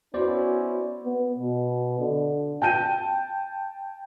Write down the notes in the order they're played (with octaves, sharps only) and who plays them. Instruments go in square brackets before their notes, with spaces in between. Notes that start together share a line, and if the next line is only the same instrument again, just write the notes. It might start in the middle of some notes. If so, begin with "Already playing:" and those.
[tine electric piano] B3 C5 D5 [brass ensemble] C#4 E4 F#4
[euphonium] B3
B2
D3
[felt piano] G5 A5 G6 D#7